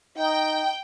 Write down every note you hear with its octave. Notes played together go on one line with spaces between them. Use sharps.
D#4 G5